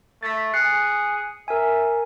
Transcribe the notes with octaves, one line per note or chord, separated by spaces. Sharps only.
A3 A6 B6
G#4 F#6 C7 C#7
A#4 E5 G#5